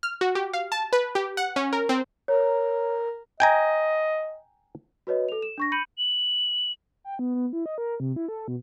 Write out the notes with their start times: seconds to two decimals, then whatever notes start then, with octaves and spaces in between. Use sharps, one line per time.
0.03 F6
0.21 F#4
0.35 G4
0.54 F5
0.72 A5
0.93 B4
1.15 G4
1.37 F#5
1.56 C#4
1.73 A#4
1.89 C4
2.28 A#4 C#5
3.40 D#5 G5 G#5 A#5
5.07 F#4 B4 C#5 D#5
5.29 A4 F7
5.42 E7
5.58 D4 C#6 A#6
5.72 B5 G6 C#7 D#7 F#7
5.98 F#7
7.04 G5
7.19 B3
7.35 B3
7.53 E4
7.66 D#5
7.78 A#4
8.00 C3
8.16 E4
8.28 A4
8.48 B2